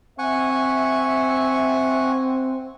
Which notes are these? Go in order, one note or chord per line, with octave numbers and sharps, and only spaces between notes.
C4 E5 F#5 G#5 C#6